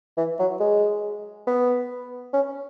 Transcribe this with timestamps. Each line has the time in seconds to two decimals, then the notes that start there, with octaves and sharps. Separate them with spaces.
0.17 E3
0.39 F#3
0.60 G#3
1.47 B3
2.33 C#4